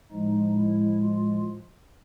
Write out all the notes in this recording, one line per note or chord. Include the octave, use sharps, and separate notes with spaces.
A2 F3 G#3 D#4
E4
F4